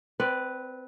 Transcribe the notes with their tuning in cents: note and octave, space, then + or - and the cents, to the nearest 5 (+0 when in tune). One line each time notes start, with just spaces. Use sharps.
C4 -25 B4 +0 D5 -10